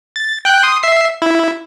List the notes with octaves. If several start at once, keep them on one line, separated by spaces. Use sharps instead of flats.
A6
G5 F#6 G6
C6 D#6
E5 C7
E4